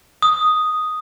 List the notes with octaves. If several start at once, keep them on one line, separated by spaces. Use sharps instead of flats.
D#6